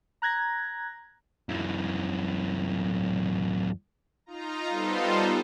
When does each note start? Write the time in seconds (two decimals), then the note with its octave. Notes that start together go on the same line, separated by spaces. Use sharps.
0.22 A#5 F#6 G#6 A#6
1.49 F#2 E3
4.26 D#4 F4 A#5
4.69 G3 B3 D#4 F4 A4 C5